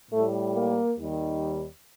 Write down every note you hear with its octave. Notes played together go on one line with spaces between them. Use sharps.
A2 G3 A3
A#3
D#2 D#3 G3